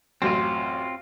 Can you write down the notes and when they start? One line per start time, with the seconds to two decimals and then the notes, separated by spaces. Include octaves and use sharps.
0.22 A1 F#2 C4 F4